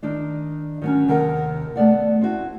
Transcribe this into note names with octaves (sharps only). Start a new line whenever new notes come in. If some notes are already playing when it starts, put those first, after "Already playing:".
D#3 D4 D#4
D#3 F#3 C#4
D#2 C3 D#3 A4 A#4 F#5
A3 B3 D5 F#5
C4 E4 F#4